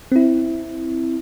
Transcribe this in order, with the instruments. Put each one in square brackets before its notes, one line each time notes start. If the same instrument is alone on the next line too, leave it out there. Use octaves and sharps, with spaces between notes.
[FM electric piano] C4 E4